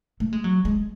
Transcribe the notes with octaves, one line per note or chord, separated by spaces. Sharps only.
A3
G#3
F#3
G#3